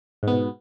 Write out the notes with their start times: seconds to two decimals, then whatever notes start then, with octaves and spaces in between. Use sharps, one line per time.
0.23 G#2
0.27 B3
0.32 B2